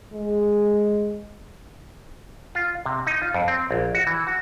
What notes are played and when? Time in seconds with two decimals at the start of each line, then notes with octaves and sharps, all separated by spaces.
0.13 G#3
2.55 F4
2.86 C3
3.07 D#4
3.22 F4
3.34 F2
3.48 C4
3.71 A#1
3.95 F#4
4.07 E3
4.27 F#4